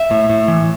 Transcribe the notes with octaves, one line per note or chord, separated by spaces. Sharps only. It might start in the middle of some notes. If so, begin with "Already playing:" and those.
Already playing: E5
A2
A2
E3